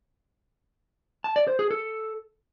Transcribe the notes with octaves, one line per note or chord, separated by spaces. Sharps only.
A5
D5
C5
G#4
A4